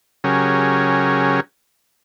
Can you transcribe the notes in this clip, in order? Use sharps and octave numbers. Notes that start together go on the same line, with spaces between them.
C#3 F#3 C#4 G4 G#4 A#4